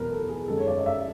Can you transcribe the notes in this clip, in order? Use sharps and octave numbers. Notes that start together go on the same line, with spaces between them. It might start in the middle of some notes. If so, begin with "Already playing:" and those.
Already playing: E2 B2 F#3 A#4 B4
A4
G#4
F#2 D#3 G#3 A4
C#5
D5
D#5
E5